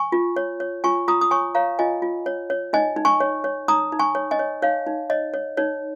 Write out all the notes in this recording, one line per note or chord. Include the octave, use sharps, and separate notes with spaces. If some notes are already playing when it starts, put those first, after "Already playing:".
Already playing: G#5 C#6
F4
C#5
C#5
F4 G#5 C#6
F4 A#5 D#6
D#6
C#5 G#5 C#6
C#5 F5 A#5
F4 D#5 G#5
F4
C#5
C#5
D#4 D#5 G#5
D#4
G#5 C#6
C#5
C#5
D#4 A#5 D#6
D#4
G#5 C#6
C#5
D#5 G#5
C#5
D#4 C#5 F5
D#4
C#5 D#5
C#5
D#4 C#5